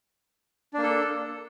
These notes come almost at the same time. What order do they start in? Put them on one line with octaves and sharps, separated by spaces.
D4 A#3 A4